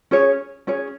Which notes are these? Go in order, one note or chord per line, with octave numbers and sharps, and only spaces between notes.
C#4 G#4 C#5
C#4 G#4 C#5